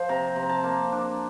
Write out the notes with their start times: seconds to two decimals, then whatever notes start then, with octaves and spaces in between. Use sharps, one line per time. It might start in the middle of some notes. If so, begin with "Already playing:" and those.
Already playing: F3 C5
0.09 C3 A#5
0.36 C3
0.43 A#5
0.49 A5
0.64 A#3
0.92 D4